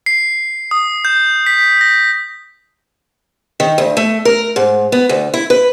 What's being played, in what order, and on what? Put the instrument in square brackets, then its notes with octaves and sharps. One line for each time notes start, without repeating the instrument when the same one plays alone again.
[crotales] C7
D#6
G6
B6
A#6
[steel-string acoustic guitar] D#3
D2
A3
A#4
G#2
B3
D2
E4
B4